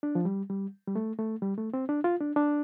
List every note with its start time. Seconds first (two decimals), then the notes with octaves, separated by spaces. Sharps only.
0.03 D4
0.15 F3
0.25 G3
0.50 G3
0.88 G3
0.96 A3
1.19 A3
1.42 G3
1.58 A3
1.74 C4
1.89 D4
2.04 F4
2.21 D4
2.36 D4